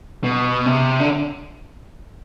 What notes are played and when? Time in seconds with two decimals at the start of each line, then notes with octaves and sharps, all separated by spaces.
0.24 B2
0.66 C3
1.00 D3